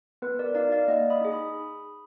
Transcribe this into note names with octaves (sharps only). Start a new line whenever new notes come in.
B3 B4
A#4 D5
D#4 F#4 D5 F5
D5 F5
A#3 D#5 F#5
B5 D#6
D#4 G#4
B5 D#6